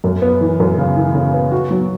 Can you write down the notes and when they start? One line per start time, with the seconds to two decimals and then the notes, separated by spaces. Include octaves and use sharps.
0.04 F#2
0.22 B3
0.41 E3
0.60 F#2
0.78 C#3
0.96 E3
1.15 C#3
1.34 B3
1.52 F#4
1.71 F#3